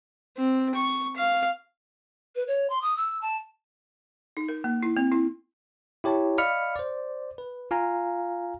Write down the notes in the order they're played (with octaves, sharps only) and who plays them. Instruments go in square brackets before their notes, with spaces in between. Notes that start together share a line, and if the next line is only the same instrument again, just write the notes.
[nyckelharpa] C4
C#6
F5
[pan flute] B4
C#5
C6
D#6
E6
A5
[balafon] D#4
A#4
A#3
E4
C4
E4
[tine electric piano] E4 G4 C#5 A5
D5 D#5 F5 B5 F6 C#7
C5 D5
B4
F4 F5 G#5 A#5